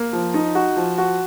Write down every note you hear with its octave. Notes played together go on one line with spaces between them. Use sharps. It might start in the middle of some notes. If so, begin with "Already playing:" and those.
Already playing: A#3
F3
D#4
F#4
F3
F#4